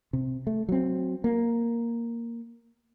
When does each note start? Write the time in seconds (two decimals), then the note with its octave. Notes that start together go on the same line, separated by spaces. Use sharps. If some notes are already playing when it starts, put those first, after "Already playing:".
0.13 C3
0.47 A3
0.69 F#3 C4
1.24 A#3